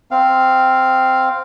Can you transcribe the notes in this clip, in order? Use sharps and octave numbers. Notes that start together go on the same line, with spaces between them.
C4 F5